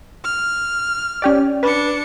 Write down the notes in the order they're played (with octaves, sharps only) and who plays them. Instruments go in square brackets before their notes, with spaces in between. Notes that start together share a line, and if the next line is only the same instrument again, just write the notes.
[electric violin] F6
[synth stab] C#4 G4 D5
[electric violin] D4 C#7 [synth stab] B4